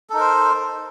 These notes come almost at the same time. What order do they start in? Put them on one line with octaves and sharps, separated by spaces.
A4 D#4 A#4 C5